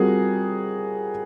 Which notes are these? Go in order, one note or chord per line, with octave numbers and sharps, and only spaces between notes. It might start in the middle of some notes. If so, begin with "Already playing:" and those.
Already playing: G3 C4 F4 F#4 G#4 A#4